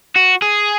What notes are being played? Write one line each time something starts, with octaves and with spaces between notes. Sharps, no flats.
F#4
G#4